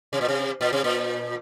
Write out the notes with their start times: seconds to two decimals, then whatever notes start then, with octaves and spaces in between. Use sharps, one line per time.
0.13 C3
0.21 A#2
0.29 C3
0.61 A#2
0.73 C3
0.84 A#2